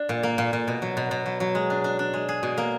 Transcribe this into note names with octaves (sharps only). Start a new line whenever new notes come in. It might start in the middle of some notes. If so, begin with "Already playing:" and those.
Already playing: D4
A#2
A#3
A#2
A#2
B2
F#3
B2
B2
F#3
F#3
G#3
D4
D4
D4
G#3
G#4
B2
A#3